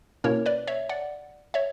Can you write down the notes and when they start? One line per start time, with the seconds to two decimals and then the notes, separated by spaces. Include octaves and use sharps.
0.24 B2 A#3 C#4 E4 A#4 C#5
0.46 B4 D5
0.67 C#5 E5
0.89 D5 F#5
1.54 C#5 E5